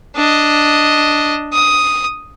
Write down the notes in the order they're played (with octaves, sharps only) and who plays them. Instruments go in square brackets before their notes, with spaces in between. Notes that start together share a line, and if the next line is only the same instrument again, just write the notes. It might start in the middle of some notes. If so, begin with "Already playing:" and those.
[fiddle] D4 D#5
D#6